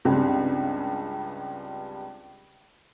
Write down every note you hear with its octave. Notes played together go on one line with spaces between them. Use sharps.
C#2 G2 C#3 G3 C4